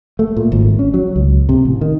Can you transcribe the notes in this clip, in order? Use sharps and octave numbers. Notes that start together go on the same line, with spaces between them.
A3
A#2
G#1
C#4
F#3
C#2
C3
A1
D#3